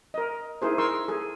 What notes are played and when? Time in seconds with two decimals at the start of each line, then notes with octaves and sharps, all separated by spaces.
0.14 A#4 D#5
0.62 D#4 E4 G#4 A#4 C5
0.78 G#4 A#4 C6 C#6 E6
1.08 G#4 A4